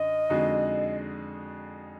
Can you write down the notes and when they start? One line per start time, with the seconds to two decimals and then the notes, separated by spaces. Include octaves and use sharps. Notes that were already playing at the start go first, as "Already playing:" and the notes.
Already playing: F#2 D3 D#5
0.30 F2 D3 G#3 D#4 F#4